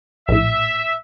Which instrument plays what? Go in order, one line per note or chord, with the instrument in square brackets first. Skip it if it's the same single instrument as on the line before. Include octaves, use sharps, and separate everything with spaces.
[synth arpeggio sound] A#1 A2 [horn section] E5